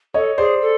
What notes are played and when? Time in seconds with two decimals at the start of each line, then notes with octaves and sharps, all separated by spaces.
0.14 A4 C#5 D#5
0.38 G#4 C5 D5
0.61 A4